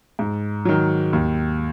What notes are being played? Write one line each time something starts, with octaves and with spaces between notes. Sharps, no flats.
G#2
D#3 F#3
D#2